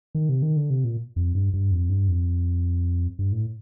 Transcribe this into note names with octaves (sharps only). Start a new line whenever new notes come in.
D#3
C3
D#3
D3
C3
A#2
F2
G2
G2
F2
G2
F2
G2
A2